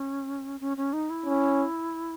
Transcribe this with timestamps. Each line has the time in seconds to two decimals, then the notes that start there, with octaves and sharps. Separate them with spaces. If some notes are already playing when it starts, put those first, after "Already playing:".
Already playing: C#4
0.60 C#4
0.77 C#4
0.93 D#4
1.10 E4
1.26 C#4